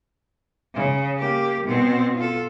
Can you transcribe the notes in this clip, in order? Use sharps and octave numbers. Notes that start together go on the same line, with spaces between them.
C#3
A#3 G4
B2 C4
F4 A4